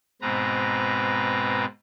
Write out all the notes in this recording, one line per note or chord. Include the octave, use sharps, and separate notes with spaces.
G#2 B2 C4 B4 A#5